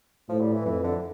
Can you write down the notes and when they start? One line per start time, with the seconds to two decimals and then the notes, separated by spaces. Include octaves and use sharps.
0.29 A2 F3
0.41 G3
0.53 E3
0.66 F2 E3
0.83 D3